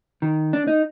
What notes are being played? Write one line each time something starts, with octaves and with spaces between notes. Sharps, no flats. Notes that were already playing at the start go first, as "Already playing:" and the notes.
D#3
D4
D#4